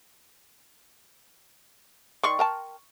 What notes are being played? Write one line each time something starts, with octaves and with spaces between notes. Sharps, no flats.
D#3 D5 C6 C#6
A#4 G5 A5